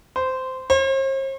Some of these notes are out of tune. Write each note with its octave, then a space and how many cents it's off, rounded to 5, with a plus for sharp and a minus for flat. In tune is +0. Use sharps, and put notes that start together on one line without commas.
C5 -15
C5 +45